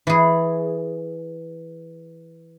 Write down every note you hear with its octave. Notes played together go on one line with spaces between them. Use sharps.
E3 G#4